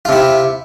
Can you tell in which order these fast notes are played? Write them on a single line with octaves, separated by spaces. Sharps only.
F4 C3 E4